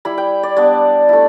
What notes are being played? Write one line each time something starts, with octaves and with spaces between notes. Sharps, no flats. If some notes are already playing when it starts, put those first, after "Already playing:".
G3 E4 B5
G5
D5
G3 B3 D4 D5
A3 E4